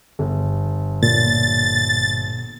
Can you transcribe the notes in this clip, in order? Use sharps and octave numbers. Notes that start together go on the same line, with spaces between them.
G1
A#2 A6